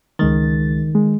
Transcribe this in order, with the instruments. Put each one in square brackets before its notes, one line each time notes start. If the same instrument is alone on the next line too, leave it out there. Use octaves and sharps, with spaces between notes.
[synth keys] C#2 G#3 A6 [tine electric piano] D#3
[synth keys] G#3